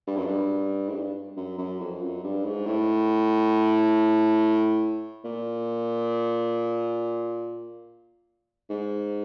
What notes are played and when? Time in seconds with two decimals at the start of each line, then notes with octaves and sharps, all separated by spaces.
0.07 G2
0.17 F#2
0.26 G2
0.89 G#2
0.94 G2
1.37 F#2
1.58 F#2
1.80 F2
2.02 F#2
2.24 G2
2.45 G#2
2.66 A2
5.25 A#2
8.70 G#2